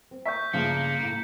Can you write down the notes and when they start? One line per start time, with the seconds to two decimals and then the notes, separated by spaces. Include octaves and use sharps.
0.11 C4
0.26 E5 C#6 G6 B6
0.53 G2 C#3 F3 A#3 C#7
1.03 A2